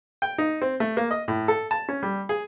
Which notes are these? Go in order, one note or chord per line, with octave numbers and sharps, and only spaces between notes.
G5
D#4
C4
A3
A#3
D#5
A2
A4
A5
C#4
G3
G#4